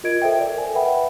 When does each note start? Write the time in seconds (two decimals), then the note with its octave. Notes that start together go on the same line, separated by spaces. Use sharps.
0.04 F4 A#4 D#5 G#6 D7
0.22 A4 C5 E5 G5
0.40 A#4 D5
0.58 G#5
0.75 B4 E5 F#5 G5 B5